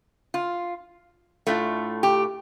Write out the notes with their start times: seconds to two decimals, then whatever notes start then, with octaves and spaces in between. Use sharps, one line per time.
0.34 F4
1.47 A2 A3 D4 F4
2.03 G4